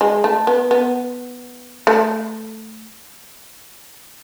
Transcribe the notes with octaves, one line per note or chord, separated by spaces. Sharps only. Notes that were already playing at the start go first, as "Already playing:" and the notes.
G#3
A3
B3
B3
A3